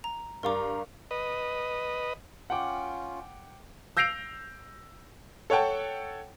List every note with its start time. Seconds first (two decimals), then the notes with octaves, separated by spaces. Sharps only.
0.04 A#5
0.43 G2 A#4 D5 F5 A#5 D6
1.11 B4 D#5
2.50 C#4 F4 F#5 G5 D6
3.97 E6 G6 A#6 C7 D7 F7
5.50 A4 C#5 F#5 G5 A5